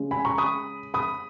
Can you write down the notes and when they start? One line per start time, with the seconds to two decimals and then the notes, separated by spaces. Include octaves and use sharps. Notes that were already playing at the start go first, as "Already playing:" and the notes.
Already playing: C#3 G#3 C#4
0.11 G#5 B5
0.25 A#5 C#6
0.38 B5 D#6
0.94 B5 D#6